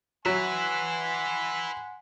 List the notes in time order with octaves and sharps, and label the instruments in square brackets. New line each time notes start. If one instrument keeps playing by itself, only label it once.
[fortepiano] F#3 [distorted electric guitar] B4 E5 [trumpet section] F#5 G#5 C6